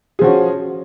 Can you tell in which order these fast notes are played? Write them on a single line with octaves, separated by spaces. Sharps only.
G#4 F3 F#4 C#4